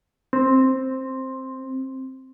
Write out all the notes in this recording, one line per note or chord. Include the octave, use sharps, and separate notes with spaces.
C4